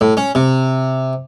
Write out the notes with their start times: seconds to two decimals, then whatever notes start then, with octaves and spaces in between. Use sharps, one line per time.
0.01 A2
0.17 C#4
0.35 C3